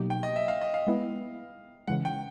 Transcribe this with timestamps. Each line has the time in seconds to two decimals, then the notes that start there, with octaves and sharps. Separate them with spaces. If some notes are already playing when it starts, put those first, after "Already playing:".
Already playing: B2 F#3 A#3 D#4 G4
0.10 G5
0.23 D#5
0.36 E5
0.48 F5
0.61 D#5
0.74 F5
0.87 G#3 B3 E4
1.87 C#3 E3 G#3 F#5
2.05 G5